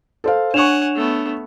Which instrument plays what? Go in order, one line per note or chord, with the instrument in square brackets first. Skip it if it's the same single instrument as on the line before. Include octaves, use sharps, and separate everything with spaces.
[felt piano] A4 C5 F5
[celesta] D4 E7 F7 [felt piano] C#5 C#6 [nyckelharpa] F#5 G#5
[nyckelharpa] A3 B3